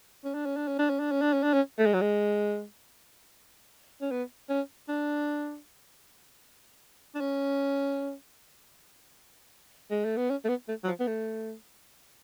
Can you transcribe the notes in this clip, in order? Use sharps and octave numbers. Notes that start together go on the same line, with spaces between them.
C#4
D4
C#4
D4
C#4
D4
C#4
D4
C#4
D4
C#4
D4
C#4
A3
G#3
F#3
G#3
C#4
B3
C#4
D4
D4
C#4
G#3
A3
B3
C#4
A3
B3
A3
F#3
F3
B3
A3